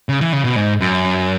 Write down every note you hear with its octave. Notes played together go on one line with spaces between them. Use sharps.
C#3
E3
C#3
B2
G#2
F#2